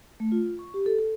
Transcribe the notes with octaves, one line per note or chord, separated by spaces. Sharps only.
A3
F4
C#6
G4
A4
A4